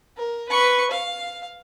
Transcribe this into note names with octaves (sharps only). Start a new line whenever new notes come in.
A#4
B4 C#6
F5